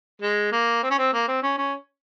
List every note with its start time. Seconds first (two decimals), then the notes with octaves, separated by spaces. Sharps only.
0.22 G#3
0.52 A#3
0.83 C4
0.91 C#4
0.98 C4
1.13 A#3
1.28 C4
1.43 C#4
1.58 C#4